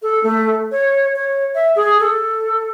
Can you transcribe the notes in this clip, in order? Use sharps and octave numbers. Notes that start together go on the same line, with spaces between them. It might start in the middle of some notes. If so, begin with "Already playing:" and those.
A4
A3
C#5
C#5
E5
G#4
A4